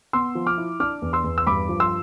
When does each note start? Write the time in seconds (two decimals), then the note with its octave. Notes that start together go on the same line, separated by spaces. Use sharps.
0.13 B3 C6 E6
0.35 F3
0.47 D6 F6
0.58 E4
0.80 D4 D6 F6
1.02 E2
1.13 C6 E6
1.24 E2
1.38 E6
1.47 G2 B5 D6
1.69 F3
1.80 C6 E6